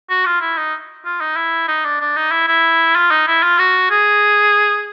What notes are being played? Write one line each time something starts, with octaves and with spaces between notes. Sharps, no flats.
F#4
F4
E4
D#4
F4
D#4
E4
D#4
D4
D4
D#4
E4
E4
F4
D#4
E4
F4
F#4
G#4